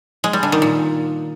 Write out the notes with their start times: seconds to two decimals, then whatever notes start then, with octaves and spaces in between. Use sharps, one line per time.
0.24 G#3
0.33 G3
0.43 D3
0.52 D#3
0.62 A#2